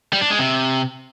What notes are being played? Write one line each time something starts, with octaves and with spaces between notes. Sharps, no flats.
G3
D4
G#3
C3